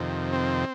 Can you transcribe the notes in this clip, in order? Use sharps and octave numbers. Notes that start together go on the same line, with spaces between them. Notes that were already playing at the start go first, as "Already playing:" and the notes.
Already playing: F2 C3 D#3
C4